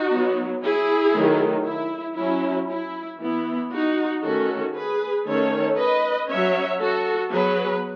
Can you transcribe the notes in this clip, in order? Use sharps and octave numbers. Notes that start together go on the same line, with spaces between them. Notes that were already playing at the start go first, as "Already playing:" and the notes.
Already playing: D#4 F#4
F#3 B3
E4 G#4
D#3 F#3 A3
E4
F#3 C#4 E4
E4
E3 B3 E4
D#4 F#4
D#3 A3 C#4 F#4 A4
G#4 B4
D#3 A3 C#4 A4 C#5
B4 D#5
F#3 C#4 C#5 E5
F#4 A4
F#3 B3 G#4 B4